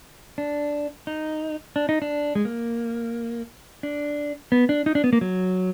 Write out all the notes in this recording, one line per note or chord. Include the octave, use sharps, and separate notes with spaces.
D4
D#4
D4
D#4
D4
G#3
A#3
D4
B3
D4
D#4
D4
B3
A#3
F#3